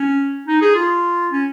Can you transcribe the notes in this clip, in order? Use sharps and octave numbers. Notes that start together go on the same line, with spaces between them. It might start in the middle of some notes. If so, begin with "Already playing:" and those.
Already playing: C#4
D#4
G#4
F4
C#4